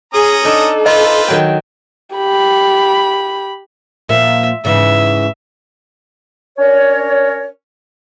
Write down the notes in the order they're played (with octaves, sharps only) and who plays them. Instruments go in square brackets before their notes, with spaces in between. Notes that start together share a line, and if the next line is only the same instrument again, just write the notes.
[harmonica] C#4 A#5 D#6 [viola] G#4
[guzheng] D4 D#4 [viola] A4
[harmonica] F4 B4 C5 [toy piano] D#5
[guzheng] D#3 F#3 G5
[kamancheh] G4 B5
[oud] A#2 F3 A#3 [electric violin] E5
[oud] G#2 C#3 E3 [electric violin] E5
[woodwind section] C#4 D4 A#4 C#5